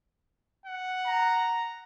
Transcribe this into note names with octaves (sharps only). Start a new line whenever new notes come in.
F#5
A#5